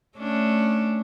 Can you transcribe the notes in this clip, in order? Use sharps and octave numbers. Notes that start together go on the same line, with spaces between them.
A3 C#4 D4